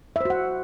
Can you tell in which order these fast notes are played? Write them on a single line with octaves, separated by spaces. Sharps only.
E5 C5 F#4 F#5